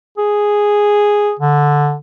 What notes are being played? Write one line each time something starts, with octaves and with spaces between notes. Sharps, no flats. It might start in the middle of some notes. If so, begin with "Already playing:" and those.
G#4
D3